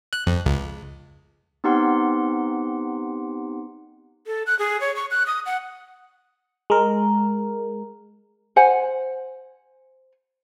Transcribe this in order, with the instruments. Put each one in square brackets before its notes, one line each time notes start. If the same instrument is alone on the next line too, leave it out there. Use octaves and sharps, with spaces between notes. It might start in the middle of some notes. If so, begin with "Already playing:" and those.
[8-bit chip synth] F#6
F2
C#2
[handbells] B3 C4 D#4 G4 F#5 C6
[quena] A4
F#6
G#4
C#5
C#6
F#6
D#6
F#5
[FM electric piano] G#3 A#4
[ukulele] C5 F#5 G#5